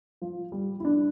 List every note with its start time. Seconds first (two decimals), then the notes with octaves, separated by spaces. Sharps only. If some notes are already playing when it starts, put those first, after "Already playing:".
0.22 F3
0.52 G3
0.80 E4
0.85 D4